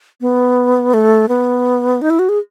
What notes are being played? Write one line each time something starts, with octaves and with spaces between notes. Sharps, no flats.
B3
A3
B3
D#4
E4
F#4
G#4